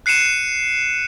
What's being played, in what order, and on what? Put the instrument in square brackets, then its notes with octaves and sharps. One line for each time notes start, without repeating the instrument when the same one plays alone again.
[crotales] F#6 C7 C#7 D#7 E7